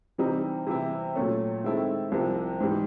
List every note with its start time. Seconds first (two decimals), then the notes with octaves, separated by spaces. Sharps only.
0.18 C3 E3 G3 C4 D#4
0.67 C3 E3 G3 C4 E4
1.15 A#2 F#3 A3 C#4
1.64 D#3 G#3 C4 E4 A4
2.12 C2 C3 F3
2.60 G#2 E3 G3